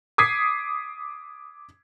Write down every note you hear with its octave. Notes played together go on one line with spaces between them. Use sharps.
D6 D#6 G#6 B6 C7